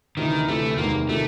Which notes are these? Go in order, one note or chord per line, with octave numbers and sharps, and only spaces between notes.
D2 C3 D#3 E3
D2 C3 E3 A3
E2 C3 D#3 G#3 A#3
C3 D#3 A3